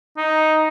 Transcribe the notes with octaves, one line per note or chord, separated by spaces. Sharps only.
D#4